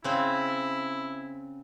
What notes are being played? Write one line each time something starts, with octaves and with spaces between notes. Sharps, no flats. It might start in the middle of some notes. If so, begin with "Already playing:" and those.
C#3 C4 E4